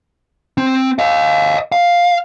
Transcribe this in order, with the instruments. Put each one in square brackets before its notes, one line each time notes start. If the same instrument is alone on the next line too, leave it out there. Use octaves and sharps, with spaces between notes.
[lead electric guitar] C4
D#5 F5
F5